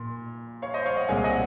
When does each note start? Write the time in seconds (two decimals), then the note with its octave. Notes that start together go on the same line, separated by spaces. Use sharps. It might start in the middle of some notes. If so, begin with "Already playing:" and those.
Already playing: A#2 C6
0.62 C#5 F5
0.74 C5 D#5
0.86 C#5 F5
0.97 D#5 F#5
1.09 C2 A#2 G#3 C4 F5 G#5
1.24 D#5 F#5